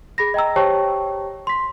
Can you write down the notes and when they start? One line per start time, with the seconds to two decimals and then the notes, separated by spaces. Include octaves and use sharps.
0.18 G#4 B5 A#6
0.34 D#5 G5 A#5 E6
0.56 G4 C5 C#5 G5 A5 C#6
1.47 C6 B6